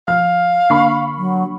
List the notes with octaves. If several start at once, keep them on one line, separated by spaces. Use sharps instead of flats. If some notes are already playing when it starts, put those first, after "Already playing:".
F3 F5 F6
D3 A#3 D4 B5 C#6 C7
F#3